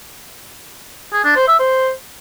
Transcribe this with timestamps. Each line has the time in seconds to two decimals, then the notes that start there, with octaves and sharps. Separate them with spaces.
1.13 G#4
1.24 D4
1.36 C5
1.48 E5
1.60 C5